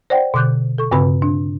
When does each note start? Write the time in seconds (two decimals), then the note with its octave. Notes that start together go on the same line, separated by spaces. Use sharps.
0.10 C5 D5 F#5 G5
0.34 B2 D3 D6 F#6 G6
0.78 A4 C#6
0.91 G2 C#3 C4 F#4 B4 B5
1.22 D4